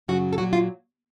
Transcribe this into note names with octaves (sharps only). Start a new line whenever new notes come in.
F#2 C#3 F#3 F#4
A4
A#2 F#3 F#4
F4